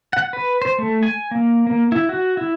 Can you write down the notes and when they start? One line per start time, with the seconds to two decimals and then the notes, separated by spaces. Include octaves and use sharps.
0.13 F#5
0.33 B4
0.62 C5
0.78 A3
1.03 G#5
1.31 A#3
1.67 A#3
1.92 E4
2.09 F#4
2.37 E4